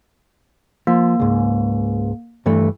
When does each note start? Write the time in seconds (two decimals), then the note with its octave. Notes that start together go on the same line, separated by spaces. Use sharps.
0.87 F3 A#3
1.20 C#2 G#2
2.46 G2 E3 A3